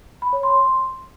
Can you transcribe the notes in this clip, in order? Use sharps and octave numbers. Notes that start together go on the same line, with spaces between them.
B5
C#5
C6